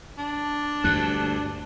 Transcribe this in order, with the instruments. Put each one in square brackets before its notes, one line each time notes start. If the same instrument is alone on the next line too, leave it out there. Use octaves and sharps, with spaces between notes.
[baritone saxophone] D4
[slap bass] D2 G2 [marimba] F#6